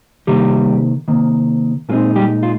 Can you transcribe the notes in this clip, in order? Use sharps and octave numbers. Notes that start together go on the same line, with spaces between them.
C3 D#3 G3 A#3 G4
C3 D#3 A#3
A#2 G#3 C4 D#4 F4
G3 G4
F4